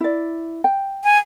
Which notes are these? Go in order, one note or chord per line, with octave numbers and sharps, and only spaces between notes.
E4 D5
G5
G#5